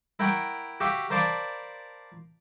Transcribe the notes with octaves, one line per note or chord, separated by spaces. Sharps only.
E4 A#4 F#5 G5 A#5 C#6
F#4 G4 E5 F5
A#4 C5 D5 F5 A5 B5